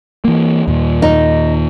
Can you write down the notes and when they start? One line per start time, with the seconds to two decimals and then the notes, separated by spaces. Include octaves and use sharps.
0.25 E3 A#3
0.68 D#2 A#2
1.02 D#4